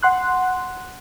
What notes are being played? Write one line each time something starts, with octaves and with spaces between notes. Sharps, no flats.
F#5 C6 F#6